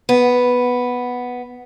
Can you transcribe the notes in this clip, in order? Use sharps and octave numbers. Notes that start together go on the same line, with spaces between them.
B3